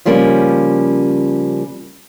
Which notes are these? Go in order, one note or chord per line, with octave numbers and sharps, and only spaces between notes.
C#3 F3 G3 A#3 C#4